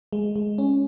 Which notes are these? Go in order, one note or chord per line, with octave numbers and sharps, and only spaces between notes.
G#3
G#3
C#4